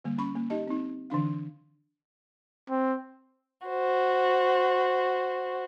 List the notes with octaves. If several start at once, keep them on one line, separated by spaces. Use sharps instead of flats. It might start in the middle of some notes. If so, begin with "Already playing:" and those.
D3 G3 A#3
C#4 B5 C#6
A#3
D#4 G4 D#5 A5
C4 D#4
D3 E3 D4 F5
C4
F#4 C5